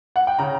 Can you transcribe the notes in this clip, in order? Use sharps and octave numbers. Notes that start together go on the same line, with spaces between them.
F#5
G5
C#3 A#5